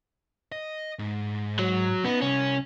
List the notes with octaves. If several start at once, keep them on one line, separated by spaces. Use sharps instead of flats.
D#5
G#2
F#3
B3 C#4 D#4
C2 C#4